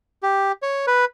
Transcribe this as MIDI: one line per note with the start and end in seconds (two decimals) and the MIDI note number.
0.23 0.52 67
0.62 0.86 73
0.87 1.05 71